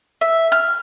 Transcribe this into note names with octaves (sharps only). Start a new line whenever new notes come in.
E5
F6